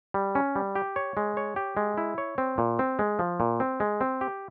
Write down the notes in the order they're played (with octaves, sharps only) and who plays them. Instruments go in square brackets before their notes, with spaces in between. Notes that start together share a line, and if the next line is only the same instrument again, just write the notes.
[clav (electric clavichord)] G3
C#4
G3
G4
C#5
G#3
C#5
G4
G#3
E4
C#5
C4
A#2
C4
G#3
F3
A#2
C4
G#3
C4
G4